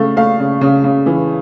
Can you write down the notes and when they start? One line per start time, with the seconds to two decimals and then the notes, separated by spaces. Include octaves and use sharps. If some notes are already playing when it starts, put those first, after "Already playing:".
Already playing: C#3 A3 F5
0.17 A3 F5
0.39 C#3
0.61 C#3
0.84 C#3
1.06 E3